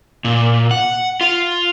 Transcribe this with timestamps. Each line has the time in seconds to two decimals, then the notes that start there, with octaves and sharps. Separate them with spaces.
0.25 A#2
0.71 F#5
1.21 F4